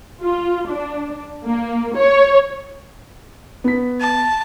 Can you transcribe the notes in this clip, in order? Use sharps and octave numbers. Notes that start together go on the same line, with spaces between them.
F4
D4
A#3
C#5
B3 B6
A5